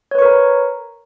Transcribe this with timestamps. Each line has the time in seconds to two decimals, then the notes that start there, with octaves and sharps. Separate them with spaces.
0.11 C#5
0.15 B4
0.19 C#6
0.22 A#4
0.26 A#5